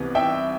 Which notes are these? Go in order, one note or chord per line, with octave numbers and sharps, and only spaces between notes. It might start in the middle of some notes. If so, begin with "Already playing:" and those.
Already playing: C2 C3 E3 B3
E5 G5